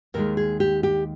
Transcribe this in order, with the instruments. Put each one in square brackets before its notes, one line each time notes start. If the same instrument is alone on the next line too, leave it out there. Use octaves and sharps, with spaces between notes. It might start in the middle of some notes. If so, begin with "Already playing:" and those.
[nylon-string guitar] D#2 D#3 G#3 A#4
G#4
G4
G4